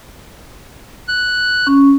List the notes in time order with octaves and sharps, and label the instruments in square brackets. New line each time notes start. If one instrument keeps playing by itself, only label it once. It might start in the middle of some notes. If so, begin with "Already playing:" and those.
[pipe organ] F#6
[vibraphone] C#4